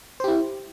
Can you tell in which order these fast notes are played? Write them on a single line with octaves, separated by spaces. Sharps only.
C5 G4 E4